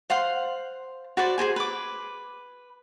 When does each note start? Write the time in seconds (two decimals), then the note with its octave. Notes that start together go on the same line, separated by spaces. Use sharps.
0.10 C5 F5 F#5 C6
1.17 F#4 B4 C5 D5
1.38 G#4 A#4 C5 G#5
1.56 B4 D6